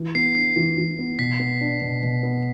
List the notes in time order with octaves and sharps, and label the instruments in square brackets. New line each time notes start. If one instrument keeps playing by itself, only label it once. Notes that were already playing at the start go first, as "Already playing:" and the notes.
Already playing: [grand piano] E3
[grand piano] B3 [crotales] C7
[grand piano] D4 [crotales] C7
[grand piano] E3
E3
B3
[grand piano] B2 [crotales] B6
[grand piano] B3
D4
B2
B2
B3